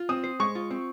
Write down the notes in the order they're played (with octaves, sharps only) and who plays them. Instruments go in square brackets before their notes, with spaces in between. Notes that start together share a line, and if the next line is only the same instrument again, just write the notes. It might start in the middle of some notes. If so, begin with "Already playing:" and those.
Already playing: [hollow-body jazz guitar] F4
[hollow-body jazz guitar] C4 [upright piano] D#6
[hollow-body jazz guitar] C5
[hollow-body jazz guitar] G#3 [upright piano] C#6
[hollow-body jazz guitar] F4
C4